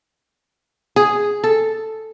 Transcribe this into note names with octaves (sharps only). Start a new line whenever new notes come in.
G#4
A4